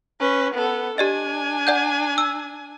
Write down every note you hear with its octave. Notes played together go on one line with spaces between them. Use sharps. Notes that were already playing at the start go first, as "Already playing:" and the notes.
C#4 B4
B3 A4
D4 G4 D5 D#5 G#5
D5 F#5 G6
E6